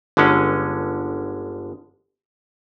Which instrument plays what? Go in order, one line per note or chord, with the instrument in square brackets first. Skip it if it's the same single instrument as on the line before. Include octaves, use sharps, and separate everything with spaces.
[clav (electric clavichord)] G1 D3 G#3 C#4